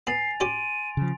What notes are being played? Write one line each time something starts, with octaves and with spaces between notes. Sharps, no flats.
B3 G#5 A6 C7 F7
C#4 G4 G5 C6 D7 D#7
C#3 F3